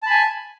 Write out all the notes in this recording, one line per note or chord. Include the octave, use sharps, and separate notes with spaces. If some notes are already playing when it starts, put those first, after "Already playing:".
G#5 A5 B5